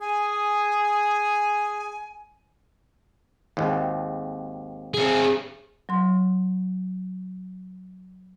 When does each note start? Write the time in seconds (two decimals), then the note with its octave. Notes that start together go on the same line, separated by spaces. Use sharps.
0.01 G#4 G#5
3.57 G#1 D#2
4.94 C4 G#4
5.89 F#3 C6